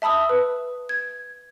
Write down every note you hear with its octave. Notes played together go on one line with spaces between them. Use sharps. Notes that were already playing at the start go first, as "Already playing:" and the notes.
E5 A5 B5 D#6 E6
B4
G#6